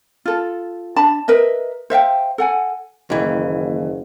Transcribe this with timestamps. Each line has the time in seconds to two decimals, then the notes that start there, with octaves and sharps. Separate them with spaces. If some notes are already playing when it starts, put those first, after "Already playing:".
0.26 F4 A4
0.96 D4 A5 B5
1.28 A#4 B4 D#5 E5
1.90 C5 E5 F5 G5
2.38 A4 F#5 G#5
3.10 F#1 D#2 E3